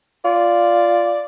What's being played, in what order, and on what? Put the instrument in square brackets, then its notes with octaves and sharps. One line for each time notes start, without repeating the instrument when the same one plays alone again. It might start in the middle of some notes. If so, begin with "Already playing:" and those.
[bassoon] F4 [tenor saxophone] D5